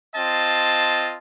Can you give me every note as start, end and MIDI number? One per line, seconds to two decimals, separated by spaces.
0.15 1.18 60
0.15 1.18 65
0.15 1.18 75
0.15 1.18 81